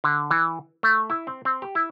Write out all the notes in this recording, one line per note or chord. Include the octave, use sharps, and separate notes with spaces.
D3
E3
A3
E4
C4
C4
G4
E4